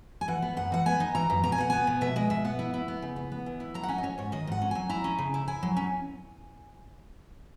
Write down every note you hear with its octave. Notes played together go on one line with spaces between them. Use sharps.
G#5
E3 F#5
B3
F#2 F#5
E3 F#5
B3 G#5
D#4
E3 A#5
F#2
B2 A#5
G#5
B2 F#5
B3 G#5
B2
B2 E5
G#3 D#5
B2 E5
B3 F#5
E4
E4
B3
C#3
B3
B3
E3
E4
F#3 A#5
F#5
C#4 G#5
D#5
C#4 C#5
G#2 C#5
D#3 D#5
G#2 F#5
C#4
F#3 G#5
E4 A#5
C#4
C#3
E4
E4 G#5
F#3
C#4